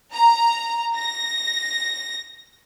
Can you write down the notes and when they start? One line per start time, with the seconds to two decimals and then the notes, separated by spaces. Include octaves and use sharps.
0.13 A#5
0.96 A#6